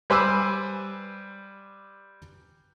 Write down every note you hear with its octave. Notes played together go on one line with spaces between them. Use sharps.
G3 B4 C5 G#5 D6 E6